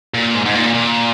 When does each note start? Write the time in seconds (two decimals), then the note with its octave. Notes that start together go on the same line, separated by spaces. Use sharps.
0.14 A#2
0.35 G#2
0.46 G#2
0.55 A#2
0.74 A#2